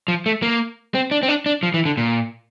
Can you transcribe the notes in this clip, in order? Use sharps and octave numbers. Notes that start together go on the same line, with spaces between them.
F3
A3
A#3
C4
D4
C4
D4
D4
F3
E3
D3
A#2